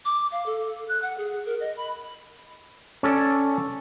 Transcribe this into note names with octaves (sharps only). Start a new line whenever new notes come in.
D6
F5
A4
F#6
F#5
G#4
A#4
D#5
B5
C#4 A4 D5